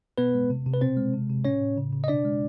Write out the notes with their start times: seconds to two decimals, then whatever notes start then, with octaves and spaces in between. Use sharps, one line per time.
0.18 B2 B3 B4
0.34 G#3
0.50 C3
0.66 C3
0.73 B4
0.81 B2 C4 C5
0.97 G#3
1.13 C3
1.29 C3
1.45 A2 C#4 C#5
1.61 A2
1.77 C#3
1.93 C#3
2.04 D#5
2.08 B2 D4 D5
2.25 G#3